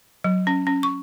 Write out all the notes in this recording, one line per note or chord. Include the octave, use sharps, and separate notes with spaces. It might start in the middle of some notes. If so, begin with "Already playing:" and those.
F#3
C#4
C#4
C#6